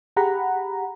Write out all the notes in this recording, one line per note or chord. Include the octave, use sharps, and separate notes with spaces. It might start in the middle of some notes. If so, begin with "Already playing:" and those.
G4 G#4 F#5 A#5 B5